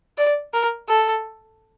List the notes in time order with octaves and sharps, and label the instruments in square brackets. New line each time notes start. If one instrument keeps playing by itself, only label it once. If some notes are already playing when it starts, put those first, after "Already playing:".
[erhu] D5
A#4
A4